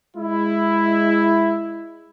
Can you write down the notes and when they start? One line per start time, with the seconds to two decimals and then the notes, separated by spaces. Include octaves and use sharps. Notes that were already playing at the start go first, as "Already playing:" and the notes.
0.16 G#3 E4